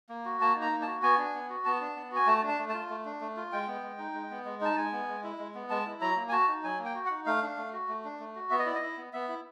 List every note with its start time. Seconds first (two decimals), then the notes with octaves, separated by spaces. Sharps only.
0.09 A#3
0.25 F#4
0.41 A#3 A5
0.56 D#4
0.61 A#5
0.71 A#3
0.82 A5
0.87 F#4
1.03 B3 G#5
1.18 D4
1.34 B3
1.50 F#4
1.65 B3 A5
1.80 D4
1.96 B3
2.11 F#4 G#5
2.27 A3 A5
2.43 D4
2.48 A5
2.59 A3
2.69 F4 A5
2.90 A3
3.05 D4
3.21 A3
3.37 F4
3.52 G#3 G5
3.68 B3
3.83 G#3
3.99 D#4
4.14 G#3
4.31 B3
4.45 G#3
4.61 D#4 A5
4.77 G#3 G#5
4.92 B3
5.08 G#3
5.24 E4
5.39 G#3
5.55 B3
5.70 G#3 A5
5.86 E4
6.01 F#3 A#5
6.16 A#3
6.29 G#5
6.32 F#4 A5
6.48 D#4
6.64 F#3 G#5
6.79 A#3
6.85 G5
6.95 F#4
7.06 D#4 F#5
7.26 A3 F5
7.42 D4
7.57 A3
7.73 F#4
7.88 A3
8.04 D4
8.20 A3
8.35 F#4
8.50 B3 E5
8.59 D#5
8.66 E4 D5
8.75 D#5
8.82 E4
8.98 B3
9.13 B3 E5
9.28 E4